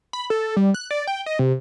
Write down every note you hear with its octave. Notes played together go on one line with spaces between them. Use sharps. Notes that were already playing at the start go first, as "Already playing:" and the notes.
B5
A4
G3
F#6
D5
G5
D#5
C3